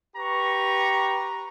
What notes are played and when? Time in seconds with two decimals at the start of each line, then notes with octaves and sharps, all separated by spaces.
0.16 G4 B4 A#5 C#6